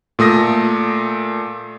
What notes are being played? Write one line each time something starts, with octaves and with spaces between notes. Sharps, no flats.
A#2 A3 D#6 A#6